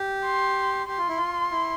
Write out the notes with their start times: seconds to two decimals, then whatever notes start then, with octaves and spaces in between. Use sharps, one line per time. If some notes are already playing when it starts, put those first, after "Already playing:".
Already playing: G4
0.25 C6
0.88 G4 C6
0.98 F4
1.09 E4
1.17 F4
1.51 E4